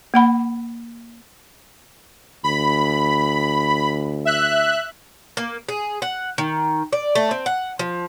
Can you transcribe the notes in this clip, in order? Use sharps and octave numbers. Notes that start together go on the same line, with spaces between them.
A#3 F#5 B5
D2 B5
E5 F#6
A#3
G#4
F#5
D#3
D5
A3
C4
F#5
F3